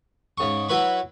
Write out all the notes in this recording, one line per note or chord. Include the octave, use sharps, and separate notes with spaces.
G#2 C#3 C#6
F#3 E4 B4 B5 C#6